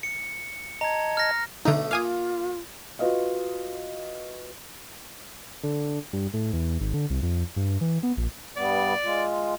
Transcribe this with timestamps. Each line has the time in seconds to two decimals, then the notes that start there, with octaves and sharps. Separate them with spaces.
0.03 C#7
0.81 D#5 A5 A#5 G#6
1.17 F6 A#6
1.65 B1 D3 A3 D#4 D#6
1.91 A#3 F4 F5 G#5 D#6
2.99 F4 F#4 B4 D#5 F5
5.63 D3
6.13 G2
6.33 A2
6.53 E2
6.80 G#1
6.94 D3
7.10 C2
7.23 F2
7.56 G2
7.81 E3
8.03 B3
8.17 A#1
8.57 G2 G3 B3 D5
9.04 G#3 F4